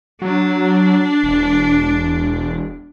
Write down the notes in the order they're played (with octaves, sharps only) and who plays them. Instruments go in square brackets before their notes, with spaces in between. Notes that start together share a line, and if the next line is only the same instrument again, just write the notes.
[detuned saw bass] F#3 [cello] D4
[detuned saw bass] E1